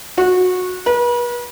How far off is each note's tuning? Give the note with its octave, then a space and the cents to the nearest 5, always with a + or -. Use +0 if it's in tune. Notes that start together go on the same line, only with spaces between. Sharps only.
F#4 -20
B4 -40